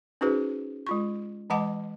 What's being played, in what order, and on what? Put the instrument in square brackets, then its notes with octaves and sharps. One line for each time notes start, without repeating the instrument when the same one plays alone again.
[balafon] C#4 D#4 F#4 G#4 B4 C5
G#3 F4 C#6
E3 G#3 D#5 F#5 A5 D6